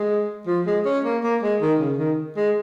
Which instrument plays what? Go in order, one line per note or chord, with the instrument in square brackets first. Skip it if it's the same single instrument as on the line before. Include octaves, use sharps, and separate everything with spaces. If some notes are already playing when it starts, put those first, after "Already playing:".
Already playing: [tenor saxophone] G#3
F3
G#3
C#4
A#3
A#3
G#3
D#3
C#3
D#3
G#3